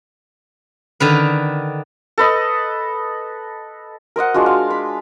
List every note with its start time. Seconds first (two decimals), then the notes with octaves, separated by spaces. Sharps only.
1.00 D3 D#3 B4
2.18 A4 B4 D#5
4.16 A#4 C5 D#5 F#5
4.34 G#3 D4 F4 F#4
4.46 F5
4.70 B5